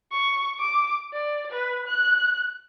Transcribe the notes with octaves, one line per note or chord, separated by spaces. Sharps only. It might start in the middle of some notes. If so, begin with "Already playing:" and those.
C#6
D6
D5
B4
F#6